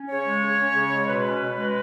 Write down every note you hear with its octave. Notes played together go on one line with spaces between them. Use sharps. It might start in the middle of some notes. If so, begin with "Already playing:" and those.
Already playing: C#4
C#3 C#5
G#3
C#3
C#4
C#3
G#3
B2 B4
C#4
B2
G#3